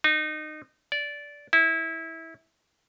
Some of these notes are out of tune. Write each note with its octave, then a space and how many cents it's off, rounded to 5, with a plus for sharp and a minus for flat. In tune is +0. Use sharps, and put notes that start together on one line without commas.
D#4 -25
D5 -15
E4 -20